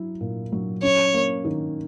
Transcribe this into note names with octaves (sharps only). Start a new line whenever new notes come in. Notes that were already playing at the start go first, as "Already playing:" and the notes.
Already playing: F#3 E4
A#2
F#3
C#4 C#5
A#3
D#3